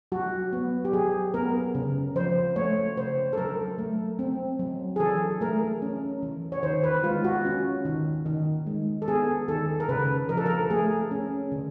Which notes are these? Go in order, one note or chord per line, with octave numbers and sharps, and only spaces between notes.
F#3 F#4
B3
G4
F#3 G#4
B3 A#4
C#3
F3 C5
A3 C#5
C#3 C5
A4
F#3 A#4
A3
C4
F#3
G#4
E3 A4
A3 A#4
C#4
E3
C#5
D#3 C5
B4
G#3 F4
F#4
C#4
D#3
D#3
G#3
A4
B3 G#4
D#3 A4
A#4
C#3 B4
F3 A#4
A4
A#4
A3 G#4
C#4
D3